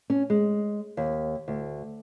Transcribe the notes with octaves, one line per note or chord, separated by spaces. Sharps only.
C#4
G#3
D#2
D2